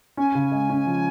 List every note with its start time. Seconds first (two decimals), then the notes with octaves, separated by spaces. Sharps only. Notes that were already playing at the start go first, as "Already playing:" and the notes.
0.17 C#4 G#5
0.35 C#3
0.52 G#3
0.69 C#4
0.87 F3